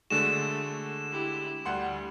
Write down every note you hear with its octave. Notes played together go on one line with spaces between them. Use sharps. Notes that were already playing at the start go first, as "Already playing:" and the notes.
D3 G#3 A3 F#4 E7
E4 G4
D2 G3 F#5 C6